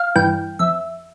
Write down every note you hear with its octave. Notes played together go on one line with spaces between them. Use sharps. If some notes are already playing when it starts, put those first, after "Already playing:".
Already playing: F5
G2 E3 G5
F2 E5